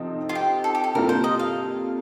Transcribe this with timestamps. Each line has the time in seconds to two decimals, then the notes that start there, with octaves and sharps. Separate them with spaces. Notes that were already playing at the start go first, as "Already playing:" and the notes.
Already playing: C3 F3 C4 D#4 A4
0.29 F4
0.35 G4
0.64 A4
0.75 G4
0.84 A4
0.94 C3 G3 A#3 F4 A4 A#4
1.09 C5
1.24 D#5
1.39 F5